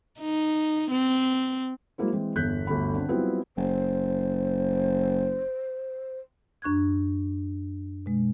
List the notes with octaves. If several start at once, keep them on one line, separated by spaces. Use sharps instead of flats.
D#4
C4
F#3 G#3 A#3 E4 C5
E3 G#3 C4
G1 E2 F#6 G6 B6
G1 D2 B5
D3 C4
F#3 G3 B3 C4 E4 F4
F#1 C5
F#2 D4 C#6 F#6 G#6
B2 G#3